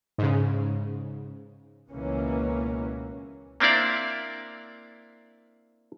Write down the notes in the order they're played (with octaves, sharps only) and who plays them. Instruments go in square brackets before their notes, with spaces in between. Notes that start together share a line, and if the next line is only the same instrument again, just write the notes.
[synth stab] G#2 C#3
[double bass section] C#2 B2 E3 A#3 C#4
[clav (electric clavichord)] A#3 C4 D4 E4 D5 F5